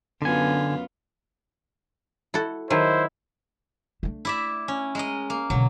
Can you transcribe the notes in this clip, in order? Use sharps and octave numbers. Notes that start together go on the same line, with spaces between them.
F#2 D3 B3 F4 G#5
E4 F#4 A4
D#3 F#3 E4 G#4 C5
A3 D4
E4 D5 E5
C#4
G#3 A#4 D#5
A#3
B2 D3 F#3